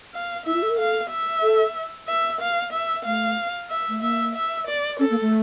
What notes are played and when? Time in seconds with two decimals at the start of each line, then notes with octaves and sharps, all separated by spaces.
0.14 F5
0.46 E4 E5
0.54 F4
0.62 A4
0.70 A#4
0.78 A4 F5
1.10 E5
1.43 A4
2.08 E5
2.40 F5
2.73 E5
3.05 A3 F5
3.70 E5
3.89 A3
4.02 A#3 E5
4.35 E5
4.67 D5
4.99 C#4 A4
5.11 A#3
5.21 A3